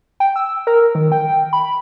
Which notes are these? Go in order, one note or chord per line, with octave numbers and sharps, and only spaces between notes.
G5
E6
A#4
D#3
G5
B5